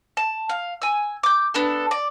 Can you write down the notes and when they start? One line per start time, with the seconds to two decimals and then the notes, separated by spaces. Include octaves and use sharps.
0.17 A5
0.49 F5
0.82 G#5 E6
1.23 D6 G6
1.54 B3 D4 A4
1.91 D5